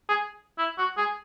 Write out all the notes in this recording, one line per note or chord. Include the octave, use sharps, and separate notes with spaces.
G#4
E4
F#4
G#4